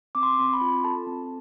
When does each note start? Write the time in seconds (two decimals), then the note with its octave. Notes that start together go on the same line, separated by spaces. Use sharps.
0.15 C4 D6
0.23 C6
0.39 C4
0.53 B5
0.61 F4
0.84 A4 A5
1.07 C4